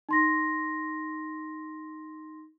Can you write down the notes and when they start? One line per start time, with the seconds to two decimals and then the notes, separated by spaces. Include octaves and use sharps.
0.09 D#4 C6 A#6